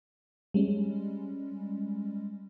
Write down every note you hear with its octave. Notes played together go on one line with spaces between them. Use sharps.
G3 G#3 C#4